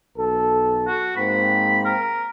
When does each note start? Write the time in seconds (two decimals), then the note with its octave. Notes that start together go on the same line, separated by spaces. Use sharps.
0.18 B1 A4
0.87 F#4
1.17 G#2 A#3 C4 B5
1.85 A#4